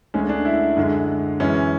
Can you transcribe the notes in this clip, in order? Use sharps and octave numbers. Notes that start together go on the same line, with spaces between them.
D2 D3 G#3 C#4
D4
E4
F#2 D3 G#3
F#2 E3 G#3 C#4